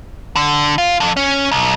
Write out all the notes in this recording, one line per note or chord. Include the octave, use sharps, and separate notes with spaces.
D3
F4
F2
C#4
B1